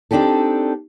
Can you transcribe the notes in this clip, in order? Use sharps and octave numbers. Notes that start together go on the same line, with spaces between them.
C4 D4 D#4 G4 A4